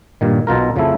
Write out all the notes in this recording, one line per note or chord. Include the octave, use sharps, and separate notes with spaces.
G2 A#2 D#3
B1 B2 F4 A#4
F2 C#3 F3 F#3 A3 E4